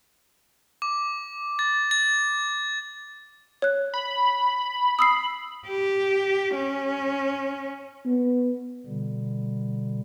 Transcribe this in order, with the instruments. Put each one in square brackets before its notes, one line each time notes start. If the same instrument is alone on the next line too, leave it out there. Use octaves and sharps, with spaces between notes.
[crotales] D6
A6
A6
[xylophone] C#5 F#6
[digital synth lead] B5
[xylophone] D#6 E6 C7
[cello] G4
C#4
[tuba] B3
[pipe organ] B2 D3 G3